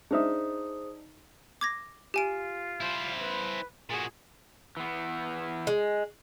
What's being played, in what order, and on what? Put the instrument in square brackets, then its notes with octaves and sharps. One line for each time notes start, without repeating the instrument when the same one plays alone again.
[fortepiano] D4 D#4 E5 [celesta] G#4 C5 D#6
[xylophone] D6 G#6 A#6
[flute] F4 [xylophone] G4 G#5 D7
[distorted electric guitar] E4 C5
[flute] B4
[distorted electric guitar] A#2 F#4 [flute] G#4
[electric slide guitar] E3 B3
[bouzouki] G#3